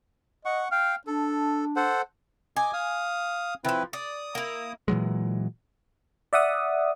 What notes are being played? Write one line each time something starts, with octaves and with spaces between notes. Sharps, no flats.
D#5 F#5 C#6
F5 G5 F6
D4 A4
A4 C5 F#5
D#5 G#5 D6
F5 D#6
D#3 F3 C4 E4 B4
D5 D#6
A#3 E4
A#2 E3 F#3 G#3
D5 E5 F#5 D#6